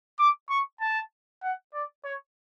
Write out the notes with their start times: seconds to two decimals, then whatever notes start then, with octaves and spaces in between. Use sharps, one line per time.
0.19 D6
0.49 C#6
0.81 A5
1.43 F#5
1.74 D5
2.05 C#5